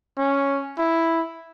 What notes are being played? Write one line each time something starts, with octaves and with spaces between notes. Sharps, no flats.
C#4
E4